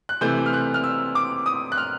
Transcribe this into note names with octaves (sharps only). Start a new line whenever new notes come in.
F#6
C3 E3 A3 G6
F6
F#6
F6
E6
D6
D#6
F#6
F6